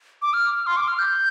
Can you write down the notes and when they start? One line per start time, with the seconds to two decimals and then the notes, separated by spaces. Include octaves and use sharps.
0.22 D6
0.33 F6
0.67 C6
0.77 D6
0.88 F6
0.99 G6